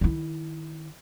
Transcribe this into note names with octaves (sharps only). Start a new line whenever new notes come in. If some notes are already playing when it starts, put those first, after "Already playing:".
D#3 E4